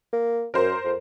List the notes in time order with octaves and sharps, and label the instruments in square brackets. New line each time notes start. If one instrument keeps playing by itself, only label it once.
[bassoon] A#3
[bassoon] F#2 [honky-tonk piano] A#4 C5
[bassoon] F2